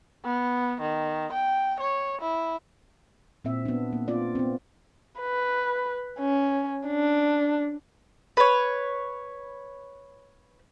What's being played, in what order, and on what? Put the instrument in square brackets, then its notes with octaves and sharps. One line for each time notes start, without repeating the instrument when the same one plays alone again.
[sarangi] B3
D#3
G5
C#5
E4
[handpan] A#2 C4 E5
B3 D4
A#3
B3 C4 F4 D5
B3 C4
[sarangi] B4
C#4
D4
[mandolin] B4 C#5